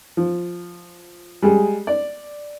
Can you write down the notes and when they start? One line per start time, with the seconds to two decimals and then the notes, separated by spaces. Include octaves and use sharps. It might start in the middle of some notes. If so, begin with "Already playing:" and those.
0.17 F3
1.42 G3 G#3 G#4
1.87 D5